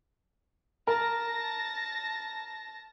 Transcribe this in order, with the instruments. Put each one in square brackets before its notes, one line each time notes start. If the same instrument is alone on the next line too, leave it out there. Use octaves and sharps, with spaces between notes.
[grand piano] A#4 [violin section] A5 A#6